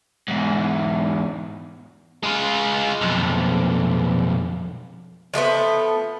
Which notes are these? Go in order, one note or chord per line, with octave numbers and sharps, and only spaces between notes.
E2 G#2
G#3 F4
B1 F2
F3 G#3 A3 B3